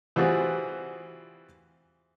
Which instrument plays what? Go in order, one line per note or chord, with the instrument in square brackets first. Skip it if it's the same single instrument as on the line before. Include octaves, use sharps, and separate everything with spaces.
[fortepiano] E3 G3 C4 F4 F#4 G#4